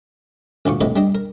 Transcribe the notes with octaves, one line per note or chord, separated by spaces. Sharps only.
A1 D2 A#2 C#6
A#1 A2 C3 B4 D#5
G3 D4 D#5
A#4